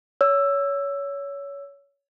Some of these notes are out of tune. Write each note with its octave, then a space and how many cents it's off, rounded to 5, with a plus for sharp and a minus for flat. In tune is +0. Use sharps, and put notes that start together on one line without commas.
C#5 +20 E6 +10